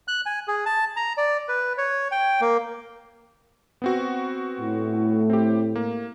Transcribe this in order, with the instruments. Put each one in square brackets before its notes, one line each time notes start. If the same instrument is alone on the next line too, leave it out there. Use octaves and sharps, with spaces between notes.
[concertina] F#6
G#5
G#4
A5
A#5
D5
B4
C#5
G5
A#3
[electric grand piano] B3 C4 F#4
[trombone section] A2
[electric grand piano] C4 G4
A#3